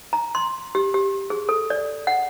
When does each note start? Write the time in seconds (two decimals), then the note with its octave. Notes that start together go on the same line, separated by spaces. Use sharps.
0.13 A#5
0.35 C6
0.75 G4
0.94 G4
1.30 G#4
1.49 A4
1.70 D5
2.07 F#5